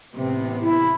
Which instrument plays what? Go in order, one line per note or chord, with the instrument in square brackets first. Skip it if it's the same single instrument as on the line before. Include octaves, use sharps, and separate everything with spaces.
[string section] A1 C3 B3
[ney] E4